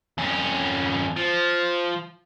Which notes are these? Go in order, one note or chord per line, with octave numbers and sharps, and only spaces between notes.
F2 C#4
F3